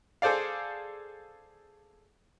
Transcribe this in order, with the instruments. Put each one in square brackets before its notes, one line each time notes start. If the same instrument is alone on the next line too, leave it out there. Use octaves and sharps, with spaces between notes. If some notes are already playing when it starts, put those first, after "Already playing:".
[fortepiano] G#4 A4 C5 D5 F5